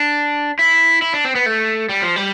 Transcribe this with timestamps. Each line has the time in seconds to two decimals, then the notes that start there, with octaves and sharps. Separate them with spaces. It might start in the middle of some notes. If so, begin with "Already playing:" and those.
Already playing: D4
0.59 E4
1.02 E4
1.14 D4
1.25 C4
1.35 B3
1.46 A3
1.89 G3
2.02 F3
2.16 G3